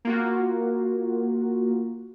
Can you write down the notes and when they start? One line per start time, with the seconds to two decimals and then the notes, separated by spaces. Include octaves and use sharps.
0.05 A#3 F4 F#4